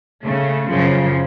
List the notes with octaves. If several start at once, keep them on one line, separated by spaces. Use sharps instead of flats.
C#3 A3
F#2 C#3 F3